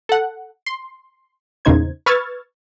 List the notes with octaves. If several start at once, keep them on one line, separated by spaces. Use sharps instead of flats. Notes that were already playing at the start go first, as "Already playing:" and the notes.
A4 F#5
C6
E2 A#2 C#3 D#4 C5 G#6
B4 C#6 E6 F6 G#6 A6